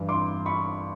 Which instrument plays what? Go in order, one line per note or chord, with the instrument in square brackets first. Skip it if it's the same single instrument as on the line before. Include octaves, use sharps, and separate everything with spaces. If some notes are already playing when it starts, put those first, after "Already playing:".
Already playing: [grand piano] G2 E3
C6 D6
B5 C#6